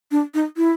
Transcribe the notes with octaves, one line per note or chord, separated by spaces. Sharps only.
D4
D#4
E4